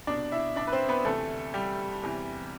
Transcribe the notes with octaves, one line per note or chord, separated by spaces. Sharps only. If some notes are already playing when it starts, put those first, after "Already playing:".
C2 B2 D4 D5
E4 E5
D4 D5
B4
C4 C5
B3 B4
D2 C3 E3 A3 A4
G3 G4
E2 C3 E3